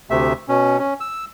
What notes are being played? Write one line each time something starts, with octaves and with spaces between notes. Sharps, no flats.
D2 C3 A3 E5
B2 C#4
C#4
E6